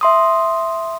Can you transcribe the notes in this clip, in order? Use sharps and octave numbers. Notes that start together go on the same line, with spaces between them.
E5 C6 D#6